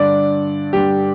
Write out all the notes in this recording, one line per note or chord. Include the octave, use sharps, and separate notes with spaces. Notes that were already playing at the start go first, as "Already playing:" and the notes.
Already playing: G2 D3 D5
G2 D3 G4